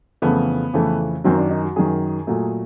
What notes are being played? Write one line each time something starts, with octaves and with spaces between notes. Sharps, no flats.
F2 C#3 E3 A3 B3
F2 C#3 E3 A3
F#2 D#3 F#3 C4
D4
D#4
F#4
F#2 D#3 F#3 G#4
A#2 F#3 A3